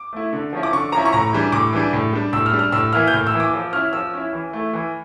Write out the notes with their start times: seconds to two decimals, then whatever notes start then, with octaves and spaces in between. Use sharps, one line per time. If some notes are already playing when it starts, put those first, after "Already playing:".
Already playing: D6
0.13 A3 E4
0.33 D3
0.53 F3 C#4 E4
0.63 D6
0.72 D3 C#6
0.92 F3 C#4 E4 A#5
1.05 C#6
1.13 A2 A#5
1.33 E3 G3 D4
1.52 A2 D6
1.73 E3 G3 D4
1.93 A2
2.13 G3 D4
2.33 A2 E6
2.46 F6
2.53 G3 D4
2.59 F6
2.72 A2 E6
2.93 E3 A#3 E4 F6
3.08 G6
3.13 A2 F6
3.27 E6
3.33 E3 A#3 E4
3.40 D6
3.53 F3
3.73 C#4 E4 F6
3.93 F3 E6
4.14 C#4 E4
4.33 E3
4.53 A3 E4
4.73 E3